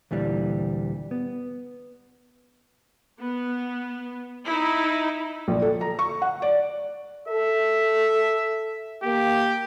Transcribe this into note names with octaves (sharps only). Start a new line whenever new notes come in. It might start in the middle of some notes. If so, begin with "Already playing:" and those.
D2 A#2 E3 G3
B3
B3
D#4 E4
A#1
A4
A#5
C#6
F#5
D5
A4 E5
A#3 G4